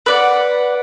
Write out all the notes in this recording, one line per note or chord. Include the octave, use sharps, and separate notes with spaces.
B4 D5 F#5